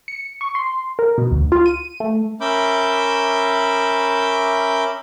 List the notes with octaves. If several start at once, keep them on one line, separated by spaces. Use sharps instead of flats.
C#7
C#6
C6
A#4
B2
D2
F4
D#7
A3
C#4 A#4 E5 B5 D6 G6